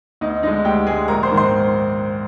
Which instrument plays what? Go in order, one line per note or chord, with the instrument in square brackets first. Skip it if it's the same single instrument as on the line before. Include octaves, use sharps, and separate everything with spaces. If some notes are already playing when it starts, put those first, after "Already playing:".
[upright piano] D2 D#4 D#5
D3 G#3 D#4 D#5
D2 G4 G5
D3 G#3 G#4 G#5
A#1 A#4 A#5
C5 C6
G#2 D#3
C5 C6